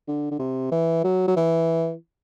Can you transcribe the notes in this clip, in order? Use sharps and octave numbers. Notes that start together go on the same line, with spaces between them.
D3
D3
C3
E3
F#3
F#3
E3